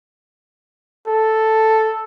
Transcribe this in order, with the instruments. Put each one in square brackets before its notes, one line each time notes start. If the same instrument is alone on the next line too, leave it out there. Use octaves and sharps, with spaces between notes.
[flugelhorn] A4